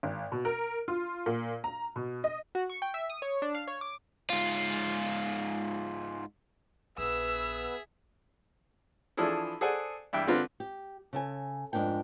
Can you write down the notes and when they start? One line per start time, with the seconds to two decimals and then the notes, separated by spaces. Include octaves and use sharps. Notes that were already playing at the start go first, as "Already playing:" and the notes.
0.03 G#1
0.32 B2
0.45 A#4
0.88 F4
1.26 A#2
1.64 A#5
1.96 B2
2.24 D#5
2.55 F#4
2.69 C#6
2.82 G5
2.94 E5
3.10 D#6
3.22 C#5
3.42 D4
3.55 F5
3.68 C#5
3.81 D6
4.30 G#2 F4
6.98 A#1 B3 G#4 B4 E5 E6
9.17 E3 F3 D4 E4 G#4 A4
9.61 G#4 A4 C5 D5 F#5 G#5
10.13 G2 E3 E5 G5
10.27 D3 C4 F4 B4
10.60 G4
11.13 C#3 A4 G#5
11.73 F2 G#2 B2 D4 A#4 G5